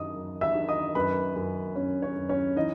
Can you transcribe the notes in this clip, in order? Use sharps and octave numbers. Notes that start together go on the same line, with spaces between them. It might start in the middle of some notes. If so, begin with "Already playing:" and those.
Already playing: F#2 D#3 D#5 D#6
F#2
E5 E6
D#3
D#5 D#6
F#2 B4 B5
F#2
F#2 C#4 C#5
C#4 C#5
F#2
C#4 C#5
E3 D#4 D#5